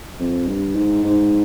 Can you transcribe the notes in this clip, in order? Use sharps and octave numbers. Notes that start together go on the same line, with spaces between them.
F2
G2
G#2
G#2